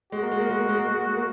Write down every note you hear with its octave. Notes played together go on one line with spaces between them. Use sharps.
G#3 F#4
A#3
G#3
A#3
G#3
A#3
G#3
A#3
G#3
A#3
G#3
A#3